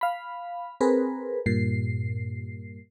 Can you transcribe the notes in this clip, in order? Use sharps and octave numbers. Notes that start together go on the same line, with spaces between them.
F5 B5
C4 G#4 A#4 B4
G2 A#2 C7